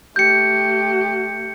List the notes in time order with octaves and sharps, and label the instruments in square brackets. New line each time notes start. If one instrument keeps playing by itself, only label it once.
[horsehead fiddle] A3 G4 [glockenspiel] G6 C#7